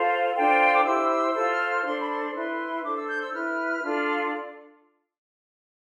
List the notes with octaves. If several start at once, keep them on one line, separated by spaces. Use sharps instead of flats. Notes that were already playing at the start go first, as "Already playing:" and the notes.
Already playing: F4 A4 C5 F5
D4 F4 A4 C5 G5
C6
D6
E4 G4 C5 E6
E6
F4 A4 C5 E6
F6
F6
D4 A4 C5 C6
B5
C6
E4 B4 C6
D4 A4 C5 D6
E6
G6
E6
E4 B4 F6
D4 F4 A4